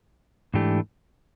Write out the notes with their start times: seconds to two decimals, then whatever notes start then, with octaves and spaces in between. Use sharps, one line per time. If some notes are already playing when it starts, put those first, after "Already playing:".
0.54 G#2 E3 A3 D4 G4